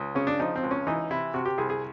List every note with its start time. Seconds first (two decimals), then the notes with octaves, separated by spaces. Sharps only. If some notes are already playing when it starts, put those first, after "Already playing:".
Already playing: C#2
0.15 C#3 C#4
0.27 D4
0.40 F3 D#4
0.56 C4
0.63 C#2
0.71 C#4
0.87 E3 D#4
1.11 C3 E4
1.34 C3 F#4
1.45 G4
1.58 C2 G#4
1.70 G#4